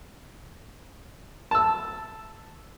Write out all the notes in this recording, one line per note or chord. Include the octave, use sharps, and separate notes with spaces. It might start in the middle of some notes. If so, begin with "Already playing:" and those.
A5 E6